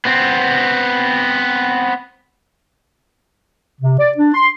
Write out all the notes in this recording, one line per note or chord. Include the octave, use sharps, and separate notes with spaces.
B3 C4
C3
D5
D4
C6